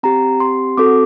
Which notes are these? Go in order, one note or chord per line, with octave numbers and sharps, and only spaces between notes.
C4 G4 A#5
C6
C4 F#4 A4 D6